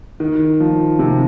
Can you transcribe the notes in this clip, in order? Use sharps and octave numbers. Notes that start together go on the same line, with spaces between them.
D#3
F3
C3